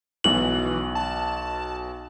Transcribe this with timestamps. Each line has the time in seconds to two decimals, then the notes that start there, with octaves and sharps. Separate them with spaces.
0.24 B1 B2 E3 F#7
0.95 A5